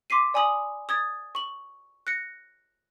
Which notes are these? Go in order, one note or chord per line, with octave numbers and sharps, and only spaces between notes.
C6 D6 B6 C7 D#7
D5 G#5 B5 D#6 F#7
D#6 G#6 A6
C#6 F#7
F#6 A#6 C#7